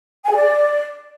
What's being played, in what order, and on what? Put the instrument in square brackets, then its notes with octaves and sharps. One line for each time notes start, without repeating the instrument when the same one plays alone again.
[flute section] G#5
G#4
D5